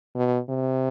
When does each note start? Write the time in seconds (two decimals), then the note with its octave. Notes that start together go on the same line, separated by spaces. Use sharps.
0.15 B2
0.49 C3